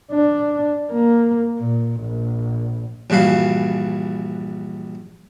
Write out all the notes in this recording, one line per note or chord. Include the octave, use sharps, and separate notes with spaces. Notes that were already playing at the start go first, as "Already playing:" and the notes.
D4
A#3
A#2
A#1
A#1 G2 E3 F#4 F5